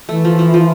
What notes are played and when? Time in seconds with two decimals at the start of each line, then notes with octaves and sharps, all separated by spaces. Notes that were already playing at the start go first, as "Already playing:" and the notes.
0.09 E3 A3
0.25 F3
0.39 F3
0.54 F3